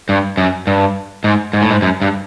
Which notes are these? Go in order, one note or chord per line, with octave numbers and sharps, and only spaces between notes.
G2
F#2
G2
G#2
G#2
A2
G#2
F#2
G2